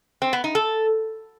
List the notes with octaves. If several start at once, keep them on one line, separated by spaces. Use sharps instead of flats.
C4
B3
D#4
A4